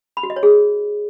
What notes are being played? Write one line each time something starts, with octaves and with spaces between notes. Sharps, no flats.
B5
F#4
D#5
C#5
G#4